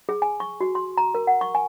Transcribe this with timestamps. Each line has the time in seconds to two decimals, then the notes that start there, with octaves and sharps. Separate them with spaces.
0.09 G#4
0.22 G#5
0.40 C#6
0.61 F#4
0.75 C6
0.97 A#5
1.15 A#4
1.27 F#5
1.41 C#6
1.55 G#5